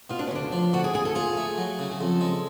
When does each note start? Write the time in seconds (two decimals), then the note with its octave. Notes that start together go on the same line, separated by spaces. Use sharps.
0.10 B2 F4
0.19 D4
0.27 C#4
0.31 D2 D4
0.52 F3
0.73 D3 F#4
0.84 G#4
0.94 D2 G#4
1.05 A4
1.15 F4 G#4
1.37 A3
1.58 F#3
1.79 C#3
1.91 G#4
2.00 F2 A4
2.21 G#3